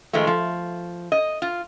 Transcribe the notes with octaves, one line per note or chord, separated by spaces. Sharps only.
D#3 F3 G#3 A3
F3
D#5
F4